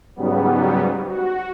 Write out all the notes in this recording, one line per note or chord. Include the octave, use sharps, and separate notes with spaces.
G#2 C#3 F#3 G3 B3
F#4